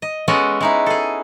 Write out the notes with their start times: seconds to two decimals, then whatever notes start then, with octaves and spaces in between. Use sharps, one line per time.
0.02 D#5
0.28 G#3 B3 C#4 F#4 A4 D#5
0.61 G#3 D#4 E4
0.86 G#4 A4